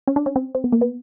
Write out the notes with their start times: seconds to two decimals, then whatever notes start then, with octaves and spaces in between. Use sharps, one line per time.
0.08 C#4
0.16 D4
0.26 C#4
0.36 C4
0.55 C4
0.64 B3
0.72 A#3
0.81 B3